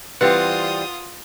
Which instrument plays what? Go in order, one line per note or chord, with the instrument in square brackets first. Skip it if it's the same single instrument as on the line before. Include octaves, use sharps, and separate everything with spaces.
[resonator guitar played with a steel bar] E3 G3 C4 [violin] F4 D#6 [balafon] B4 [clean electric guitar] F#5